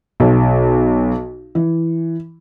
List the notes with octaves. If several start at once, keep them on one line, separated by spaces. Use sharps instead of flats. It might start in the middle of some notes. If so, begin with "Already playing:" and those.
B1
E3